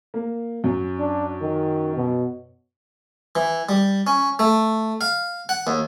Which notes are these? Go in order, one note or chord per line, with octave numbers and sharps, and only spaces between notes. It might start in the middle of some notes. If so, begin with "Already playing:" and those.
A#3
F#2
D4
D#3
B2
E3
G3
C#4
A3
F5
F#5
D#2